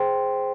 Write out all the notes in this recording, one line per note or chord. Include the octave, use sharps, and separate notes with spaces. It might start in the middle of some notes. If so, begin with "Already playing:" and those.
Already playing: G#4 C5 G5 C6